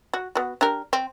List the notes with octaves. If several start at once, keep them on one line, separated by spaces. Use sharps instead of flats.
F#4
B3 F#4
D4 G4 A#4
C4